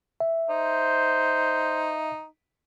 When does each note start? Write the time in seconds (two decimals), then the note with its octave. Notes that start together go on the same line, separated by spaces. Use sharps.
0.20 E5
0.50 D#4 C5